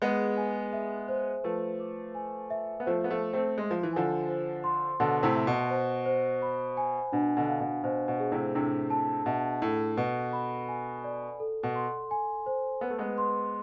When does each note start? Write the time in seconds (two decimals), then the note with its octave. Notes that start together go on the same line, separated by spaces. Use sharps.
0.02 G#3 B3 G#4
0.37 G#5
0.73 E5
1.08 C5
1.44 F3 A3 B4
1.80 D6
2.15 G#5
2.50 E5
2.80 B3
2.86 F3 A3 C5
3.04 B3
3.10 F3 A3
3.22 C5
3.33 A3 C4
3.57 G#3 C6
3.71 F3
3.83 E3
3.93 D3 F3 G#5
4.28 C5
4.64 C6
5.00 B2 D3 A5
5.23 A2 C3
5.36 E5
5.47 B2
5.70 C5
6.06 C5
6.42 B5
6.77 G#5
7.12 B2 D4
7.37 B2 D3
7.48 F5
7.60 B2
7.84 B2 C5
8.08 B2
8.20 G#4
8.32 A2 C3
8.55 A2 C3 D4
8.90 A5
9.26 B2 E5
9.62 A2 A4
9.97 B2 B4
10.33 B5
10.68 G#5
11.04 D5
11.40 A4
11.63 B2
11.75 C6
12.11 G#5
12.46 C5
12.81 B3 B4
12.90 A3
12.98 G#3 B3
13.18 C6